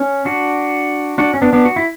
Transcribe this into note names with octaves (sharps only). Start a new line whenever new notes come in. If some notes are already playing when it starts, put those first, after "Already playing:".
Already playing: C#4
D4 F#4
D4 F#4
C#4
B3 D4
B3 D4
F#4
E4